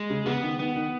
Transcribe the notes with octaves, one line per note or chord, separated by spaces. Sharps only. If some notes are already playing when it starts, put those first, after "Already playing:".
Already playing: G#3
C#3
C#3 B3
D#3
D#3 B3
D#3